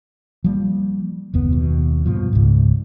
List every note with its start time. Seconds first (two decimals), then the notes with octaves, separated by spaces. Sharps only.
0.44 F3 G3 A#3
1.34 F#1 D#2 B3
1.52 D#2 B2
2.06 G2 B2 F3
2.33 C#2 G#2